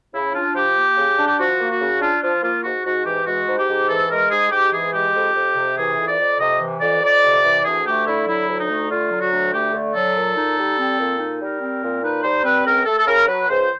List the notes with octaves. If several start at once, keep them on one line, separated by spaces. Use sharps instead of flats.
C#3 E4
D4 F4
F3 G4
A#3
C#3
D4
G4
F3 F#4
A#3
F#4
C#3
D4 F4
F3 F4
A#3 F4
G#2 F#4
G#2 F#4
E3 G4
G#3 F#4
G#2
G4
G#2
E3 A4
G#3 A#4
G#2 G#4
G#2 G4
E3 G#4
G#3 G4
F2
F2
C3
E3 G#4
F2
D5
F2
C3 D#5
E3
F2 D5
F2 D5
C3
E3
D2 G#4
A3 G4
D3 E4
F#3 E4
D2
D#4
A3
D3 F4
F#3
F#4
D2
A3 G4
D3
F#3 A4
A#2
D#4
G3
C4
A#2
D#4
G3 A#4
C4
A#2
D#4 B4
G3 C5
C4 B4
C#2 A#4
A3 A4
A4
C#3 A#4
F#3 B4
C#2 C5